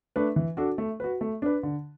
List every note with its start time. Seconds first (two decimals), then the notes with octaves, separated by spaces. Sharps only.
0.16 A3 D4 B4
0.36 E3
0.57 D4 F#4 A4
0.78 A3
1.00 F#4 B4
1.21 A3
1.42 D4 B4
1.63 D3